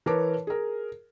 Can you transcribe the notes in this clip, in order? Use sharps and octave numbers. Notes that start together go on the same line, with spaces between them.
E3 A#4 B4 C#5 A5 D6
G#4 A#4